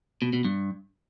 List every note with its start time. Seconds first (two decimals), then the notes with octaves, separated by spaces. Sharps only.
0.22 B2
0.33 B2
0.44 G2